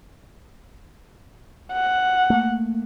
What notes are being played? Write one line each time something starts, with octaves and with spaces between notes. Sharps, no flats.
F#5
A3 A#3